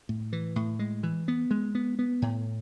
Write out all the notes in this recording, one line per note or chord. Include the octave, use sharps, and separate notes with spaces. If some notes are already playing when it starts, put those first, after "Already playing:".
A2
E3
A2
G#3
E3
B3
G#3
B3
B3
A2